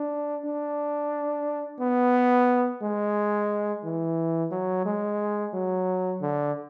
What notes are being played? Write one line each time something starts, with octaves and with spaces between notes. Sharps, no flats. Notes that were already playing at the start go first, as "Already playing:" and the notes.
Already playing: D4
D4
B3
G#3
E3
F#3
G#3
F#3
D3